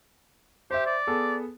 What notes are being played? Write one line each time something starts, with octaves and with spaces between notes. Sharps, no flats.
G4 C5 E5
D5
B3 G#4 A4